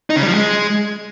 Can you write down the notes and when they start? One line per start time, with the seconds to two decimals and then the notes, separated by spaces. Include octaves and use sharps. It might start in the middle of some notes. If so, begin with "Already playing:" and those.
0.10 D#4
0.16 C#3
0.22 G3
0.28 F3
0.34 G#3